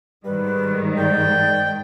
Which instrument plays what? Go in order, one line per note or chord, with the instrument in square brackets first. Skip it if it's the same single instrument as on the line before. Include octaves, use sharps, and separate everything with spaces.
[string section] G#2 D#3 [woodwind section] G3 [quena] B4
[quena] D5 [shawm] G5